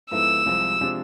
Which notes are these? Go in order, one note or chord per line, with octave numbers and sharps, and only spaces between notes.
G#2 F3 B3 E4 A4 E6
C2 C3 F3 G#3
C3 F3 G#3 D4